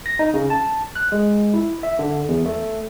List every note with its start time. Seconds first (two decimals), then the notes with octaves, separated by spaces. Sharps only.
0.06 A#6
0.19 D#4
0.34 C#3
0.50 A5
0.96 F#6
1.12 G#3
1.54 E4
1.83 E5
1.99 D3
2.28 E2
2.45 A3